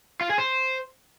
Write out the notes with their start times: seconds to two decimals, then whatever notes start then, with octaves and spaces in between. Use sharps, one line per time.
0.21 F4
0.29 G#4
0.38 C5